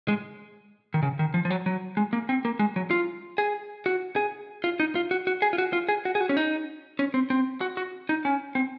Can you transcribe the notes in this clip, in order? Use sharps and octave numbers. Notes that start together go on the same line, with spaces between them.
G#3
D#3
C#3
D#3
F3
F3
F#3
F#3
G#3
A#3
C4
A#3
G#3
F#3
F4
G#4
F#4
G#4
F4
D#4
F4
F#4
F#4
G#4
F4
F#4
F4
G#4
F#4
G#4
F#4
C#4
D#4
C#4
C4
C4
F#4
F#4
D#4
C#4
C4